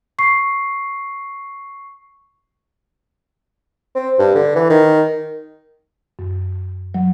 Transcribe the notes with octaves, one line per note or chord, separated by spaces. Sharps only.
C#6 C7
C4
G2
D3
E3
D#3
F#2
F#3